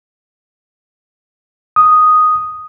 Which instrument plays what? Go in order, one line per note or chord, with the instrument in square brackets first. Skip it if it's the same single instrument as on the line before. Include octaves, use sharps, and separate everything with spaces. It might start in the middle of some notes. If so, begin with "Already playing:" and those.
[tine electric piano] D#6